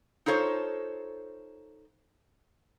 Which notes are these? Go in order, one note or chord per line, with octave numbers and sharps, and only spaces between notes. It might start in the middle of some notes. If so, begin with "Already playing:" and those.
D#4 F4 A4 C5 C#5